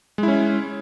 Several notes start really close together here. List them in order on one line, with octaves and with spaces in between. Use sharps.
G#3 E4 C#4